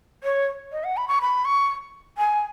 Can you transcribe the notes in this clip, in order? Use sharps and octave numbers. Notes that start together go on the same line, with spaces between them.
C#5
D#5
F#5
B5
C#6
B5
C#6
G#5